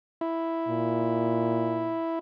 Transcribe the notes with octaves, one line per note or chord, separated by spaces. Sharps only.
E4
A#2